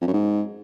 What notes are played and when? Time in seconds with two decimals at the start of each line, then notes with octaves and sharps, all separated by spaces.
0.02 F2
0.07 F#2
0.13 G#2